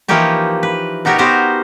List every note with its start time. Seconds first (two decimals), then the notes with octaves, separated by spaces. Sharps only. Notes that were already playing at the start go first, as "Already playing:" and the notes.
0.08 E3 F3 A#3 D#4 G4 C#5
0.63 B4
1.05 B2 D#4 F#4 G4 A#4 C#5
1.18 B3 F#4 G4 A#4 C5